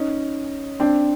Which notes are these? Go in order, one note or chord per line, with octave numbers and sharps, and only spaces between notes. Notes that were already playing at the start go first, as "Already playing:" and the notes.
Already playing: C#4 D#4
C4 D4